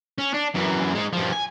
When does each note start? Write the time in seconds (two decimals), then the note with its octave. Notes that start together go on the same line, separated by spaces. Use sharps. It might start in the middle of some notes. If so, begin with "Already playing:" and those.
0.18 C#4
0.34 D4
0.54 F#2 E3
0.95 G#3 D#4
1.13 G2 F3
1.32 G#5